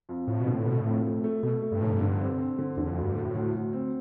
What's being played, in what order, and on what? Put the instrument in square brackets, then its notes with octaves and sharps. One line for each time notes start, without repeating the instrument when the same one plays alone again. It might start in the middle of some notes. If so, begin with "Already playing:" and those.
[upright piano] F2
[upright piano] F2 [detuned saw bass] A2
[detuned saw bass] B2
[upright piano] D3
[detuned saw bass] A2
[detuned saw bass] B2 [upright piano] A3
[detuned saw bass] A2
[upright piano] F2
A3
A3
[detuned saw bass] B2 [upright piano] A3
[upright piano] A3
[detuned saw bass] G2
[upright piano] F1 [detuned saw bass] A2
[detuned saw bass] G2
[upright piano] D3
C4
C4
D3
[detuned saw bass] E2 [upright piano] D3
[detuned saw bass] F2
[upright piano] D2
[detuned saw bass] G2
[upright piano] D2 [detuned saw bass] A2
[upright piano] D2
D2
C4